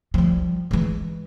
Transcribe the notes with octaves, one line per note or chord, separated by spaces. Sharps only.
F3 G3
E3 G#3